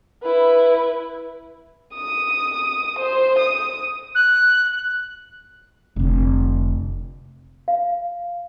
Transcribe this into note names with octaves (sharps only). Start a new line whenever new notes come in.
E4 B4
D#6
C5
D#6
F#6
F1 D3
F5